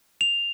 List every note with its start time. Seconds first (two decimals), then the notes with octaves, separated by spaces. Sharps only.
0.21 F7